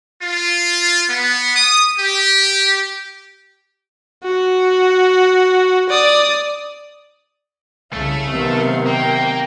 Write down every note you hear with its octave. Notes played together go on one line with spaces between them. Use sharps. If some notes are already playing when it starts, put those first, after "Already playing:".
F4
B3
D#6
G4
F#4
D5 D#6
C2 C#3 A3 F5
C3 D#3 F#3 B3 C4
A#3 G5